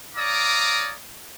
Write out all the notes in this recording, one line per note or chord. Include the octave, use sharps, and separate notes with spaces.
C#5 D5 F5 A#5 D6 D#6